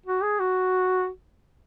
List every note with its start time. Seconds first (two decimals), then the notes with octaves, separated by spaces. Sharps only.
0.06 F#4
0.23 G#4
0.39 F#4